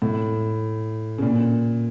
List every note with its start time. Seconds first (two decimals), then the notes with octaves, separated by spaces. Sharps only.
0.02 A2
1.18 C#3
1.22 A#2